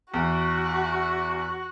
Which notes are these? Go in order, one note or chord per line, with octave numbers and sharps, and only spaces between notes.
E2 F#4